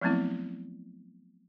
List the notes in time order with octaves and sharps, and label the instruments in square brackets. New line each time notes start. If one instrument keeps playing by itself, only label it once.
[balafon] F3 F#3 A3 B3 C4 E4